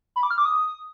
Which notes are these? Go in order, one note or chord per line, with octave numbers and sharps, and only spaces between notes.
B5
D6
F6
D6
D#6